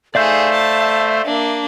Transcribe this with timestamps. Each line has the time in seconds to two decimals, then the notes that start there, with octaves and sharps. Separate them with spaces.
0.15 A3 D#4 G#4 C5 D5 E5 F5 G6
0.54 A5
1.25 A#3 D4